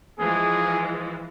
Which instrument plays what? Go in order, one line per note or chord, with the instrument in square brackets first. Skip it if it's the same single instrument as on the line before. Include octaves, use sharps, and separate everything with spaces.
[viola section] E3 F3 G#3 [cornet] G#4